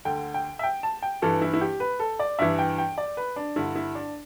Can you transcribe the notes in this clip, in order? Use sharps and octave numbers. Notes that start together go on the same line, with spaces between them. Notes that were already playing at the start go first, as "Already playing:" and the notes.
D2 D3 G5
G5
E5
G5
A5
G5
G2 E3 A4
E4
E4
G4
B4
A4
D5
G2 E3 E5
G5
G5
D5
B4
D4
G2 D3 E4
E4
D4